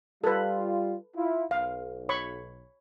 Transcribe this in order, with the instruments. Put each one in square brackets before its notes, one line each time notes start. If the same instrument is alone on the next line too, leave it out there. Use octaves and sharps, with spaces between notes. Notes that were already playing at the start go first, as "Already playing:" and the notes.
[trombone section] G3 F4 [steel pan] A4 B4
[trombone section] E4 F4
[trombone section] B1 [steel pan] F5
[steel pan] C#5 B5 C#6